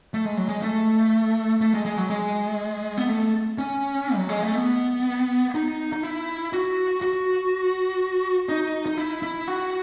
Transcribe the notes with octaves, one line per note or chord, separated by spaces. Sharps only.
A3
G#3
F#3
G#3
A3
A3
G#3
G#3
F#3
G#3
B3
A3
C#4
F#3
G#3
A3
B3
D#4
D#4
E4
F#4
F#4
D#4
D#4
E4
E4
F#4